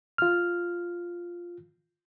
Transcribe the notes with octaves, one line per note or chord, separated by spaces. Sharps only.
F4 F6